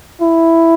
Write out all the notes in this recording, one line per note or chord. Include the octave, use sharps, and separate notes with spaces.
E4